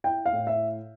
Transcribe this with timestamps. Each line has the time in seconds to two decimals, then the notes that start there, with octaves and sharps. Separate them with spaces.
0.04 E4 G5
0.26 F5
0.32 A2
0.47 E5